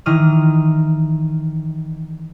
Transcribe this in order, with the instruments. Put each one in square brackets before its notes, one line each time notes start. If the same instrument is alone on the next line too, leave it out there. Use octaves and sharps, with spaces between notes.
[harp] D#3 E3 D#6 F6